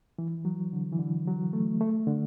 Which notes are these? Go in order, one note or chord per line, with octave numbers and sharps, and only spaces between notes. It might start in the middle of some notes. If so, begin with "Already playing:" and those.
E3
F#3
D3
E3
D3
F#3
A3
A3
D3